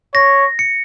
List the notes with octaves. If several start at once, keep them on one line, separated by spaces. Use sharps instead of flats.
C#5 A#6
C#7